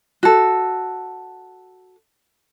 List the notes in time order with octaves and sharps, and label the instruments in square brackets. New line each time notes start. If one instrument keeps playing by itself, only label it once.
[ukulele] F#4 A4